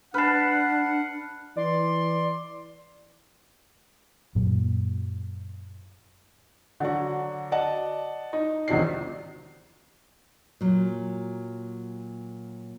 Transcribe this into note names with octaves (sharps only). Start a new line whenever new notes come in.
D4 B4 F#5 A5 F6 C7
E3 D5 C6
F#2 A#2 F#3
D3 F#3 D4 F#4
D5 D#5 F#5 A5
D#4
B1 E2 C3 D#3 D4 C7
A#2 F#3